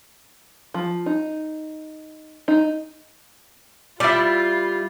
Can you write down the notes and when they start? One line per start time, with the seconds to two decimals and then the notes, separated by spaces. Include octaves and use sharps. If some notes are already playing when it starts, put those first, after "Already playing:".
0.74 F3
1.06 D#4
2.48 D#4
4.00 G3 E4 F4 D5 E5